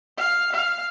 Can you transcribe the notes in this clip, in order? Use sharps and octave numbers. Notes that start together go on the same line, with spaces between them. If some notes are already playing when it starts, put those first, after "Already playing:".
F5
F5